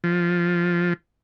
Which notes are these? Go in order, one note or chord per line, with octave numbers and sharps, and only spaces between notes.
F3